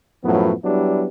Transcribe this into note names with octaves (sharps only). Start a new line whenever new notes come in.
F#2 A2 F3 F#3 B3
F#3 G3 B3 D4 E4 G4